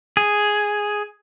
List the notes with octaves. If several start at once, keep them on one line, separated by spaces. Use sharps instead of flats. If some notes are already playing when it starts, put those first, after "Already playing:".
G#4